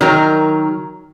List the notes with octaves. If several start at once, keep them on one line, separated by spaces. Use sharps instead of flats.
D#3 F#3 A#4